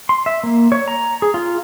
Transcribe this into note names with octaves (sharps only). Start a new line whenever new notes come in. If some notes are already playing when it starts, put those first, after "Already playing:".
C6
E5
A#3
C#5
A#5
G#4
F4